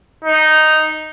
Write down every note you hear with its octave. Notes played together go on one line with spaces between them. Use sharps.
D#4